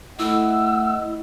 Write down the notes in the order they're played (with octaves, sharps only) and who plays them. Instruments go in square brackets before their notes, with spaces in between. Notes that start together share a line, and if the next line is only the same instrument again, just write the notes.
[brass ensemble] A3 D#5 F#5 [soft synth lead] E4 [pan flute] E6